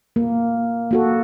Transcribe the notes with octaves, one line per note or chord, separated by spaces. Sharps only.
A#3
A#3 F#4 A4